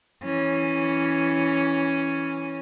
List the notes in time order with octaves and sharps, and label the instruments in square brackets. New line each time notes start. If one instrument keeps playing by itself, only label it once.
[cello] E3 C#4